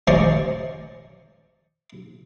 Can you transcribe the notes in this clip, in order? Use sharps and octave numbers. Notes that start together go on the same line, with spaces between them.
C#4 C5 D5 D#5 C6 C#6